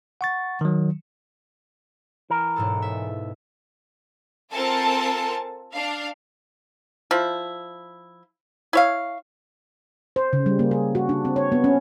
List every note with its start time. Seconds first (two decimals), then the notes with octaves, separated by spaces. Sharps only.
0.21 F#5 C#6 A6
0.61 D#3 F#3
2.30 E3 A#4
2.56 E1 G#2 A4
2.82 E5
4.51 C4 F4 A4 A#4 G#5 A5
5.74 D4 F5
7.11 F3 E4
8.73 E4 C#5 F5
10.16 C5
10.33 C#3
10.46 G3
10.59 A#3
10.71 G#4
10.95 F#4
11.09 D4
11.25 C4
11.36 C#5
11.52 B3
11.64 C#4